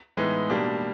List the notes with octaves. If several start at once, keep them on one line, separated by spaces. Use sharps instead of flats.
A2 E3 G#3 B3 D#4
B2 G3 A#3 D4